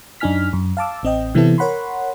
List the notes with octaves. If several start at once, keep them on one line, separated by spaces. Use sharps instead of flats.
F#2 D4 D#4 G#5 F6 B6
F#2
F5 A5 D6 E6
A1 C4 D#5 G5
C3 E3 B3 C4 E4 A4
A#4 C#5 F#5 B5 C6